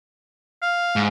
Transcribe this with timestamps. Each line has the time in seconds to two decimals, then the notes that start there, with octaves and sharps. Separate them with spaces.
0.62 F5
0.96 G#2